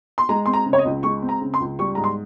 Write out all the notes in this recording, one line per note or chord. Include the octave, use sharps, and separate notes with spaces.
C6
G#3 A#5
C4 C6
A#5
C#3
C#5
D#5
C#2
G#3 C#6
C4
A#5
C#3
C6
C#2
G3 C#6
G#2 A#5
C6